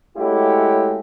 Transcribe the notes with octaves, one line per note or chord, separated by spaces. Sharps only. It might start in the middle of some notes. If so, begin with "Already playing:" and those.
G#3 A3 C#4 E4 F#4 G4